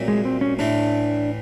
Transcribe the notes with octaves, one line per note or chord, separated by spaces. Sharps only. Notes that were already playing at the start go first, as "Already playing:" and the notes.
Already playing: C2 A#2 F#3 A3
G#3
C4
C#4
A2 E3 A3 D4